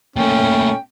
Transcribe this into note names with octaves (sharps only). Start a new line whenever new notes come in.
A#2 A3 C#4 G5